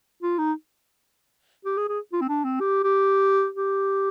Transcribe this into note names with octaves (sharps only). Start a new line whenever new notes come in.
F4
D#4
G4
G#4
G#4
F4
C4
D4
C4
G4
G4
G4